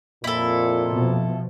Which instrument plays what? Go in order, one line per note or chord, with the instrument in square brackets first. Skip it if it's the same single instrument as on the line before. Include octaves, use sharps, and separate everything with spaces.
[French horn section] F2 A#2 [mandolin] E4 A4
[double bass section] B2 F3